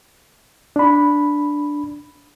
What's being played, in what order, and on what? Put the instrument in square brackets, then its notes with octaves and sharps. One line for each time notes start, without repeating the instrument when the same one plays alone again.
[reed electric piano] D4 B5